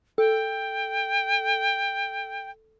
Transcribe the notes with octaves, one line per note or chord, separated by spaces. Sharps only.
A4 G5